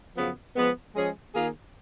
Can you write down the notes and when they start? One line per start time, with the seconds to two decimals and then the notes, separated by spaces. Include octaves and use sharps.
0.16 F#2 C#3 F3 B3
0.56 F3 G#3 B3
0.95 F3 G#3 C#4 G#4
1.35 D#3 A#3 F4 G#4